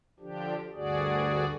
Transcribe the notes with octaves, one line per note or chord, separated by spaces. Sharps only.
D3 F3 D4 G4
D2 G2 D3 F#4 G#4 D5